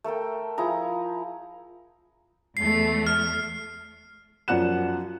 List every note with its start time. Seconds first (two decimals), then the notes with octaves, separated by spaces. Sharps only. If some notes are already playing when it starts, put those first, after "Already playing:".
0.04 A3 A4 A#4 G5
0.58 F3 E4 G#4 A#5
2.57 E2 A3 C7
3.07 F6
4.48 F#2 F3 D5 F#5 F#6 E7